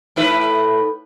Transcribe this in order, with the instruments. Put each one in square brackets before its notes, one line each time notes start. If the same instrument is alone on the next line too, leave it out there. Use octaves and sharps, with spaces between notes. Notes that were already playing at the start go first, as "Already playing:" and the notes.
[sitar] A2 E4 B4